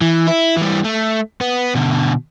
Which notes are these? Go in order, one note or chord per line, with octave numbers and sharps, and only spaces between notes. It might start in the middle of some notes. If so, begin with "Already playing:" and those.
E3
E4
E3 G3
A3
B3
B2 D3